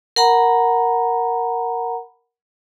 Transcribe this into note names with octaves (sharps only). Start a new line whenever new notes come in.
A#4 F#5 A#5 B5